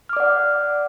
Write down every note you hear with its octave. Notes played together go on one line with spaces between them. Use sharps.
D5 F#5 D6 F6